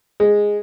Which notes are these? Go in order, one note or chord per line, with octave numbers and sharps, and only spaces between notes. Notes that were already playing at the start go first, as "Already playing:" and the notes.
G#3